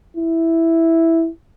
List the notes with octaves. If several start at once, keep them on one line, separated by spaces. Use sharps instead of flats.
E4